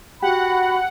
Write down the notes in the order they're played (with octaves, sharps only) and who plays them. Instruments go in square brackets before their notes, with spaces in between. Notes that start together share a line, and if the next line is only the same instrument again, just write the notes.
[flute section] F#4 B5 [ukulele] G4 [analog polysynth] F#5